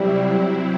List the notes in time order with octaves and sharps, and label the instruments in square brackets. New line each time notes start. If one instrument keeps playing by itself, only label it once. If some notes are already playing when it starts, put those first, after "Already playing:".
Already playing: [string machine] C3 F#3 C4 E4 [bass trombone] G3